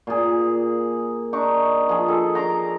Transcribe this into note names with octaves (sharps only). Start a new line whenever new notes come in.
A#2 G#4
D4 D#4 C#6 D6
F3 G#4
G#4 A4 A5
A#5 C6 D6